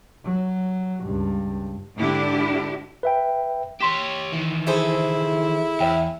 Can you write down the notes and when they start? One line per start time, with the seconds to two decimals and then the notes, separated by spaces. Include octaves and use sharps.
0.24 F#3
1.05 C#2 G2
1.96 G#2 D3 D4 E4 G4
3.03 B4 E5 G5
3.80 G4 C#5 C6 B6 E7
4.33 D#3 E3
4.67 E4 G#4 A4 C5
5.80 E2 C#5 E5 G5